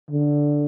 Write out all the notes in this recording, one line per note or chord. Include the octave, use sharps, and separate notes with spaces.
D3